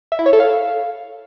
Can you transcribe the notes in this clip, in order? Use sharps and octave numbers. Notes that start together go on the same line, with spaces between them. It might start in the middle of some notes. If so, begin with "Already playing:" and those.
E5
E4
C#5
A4
F5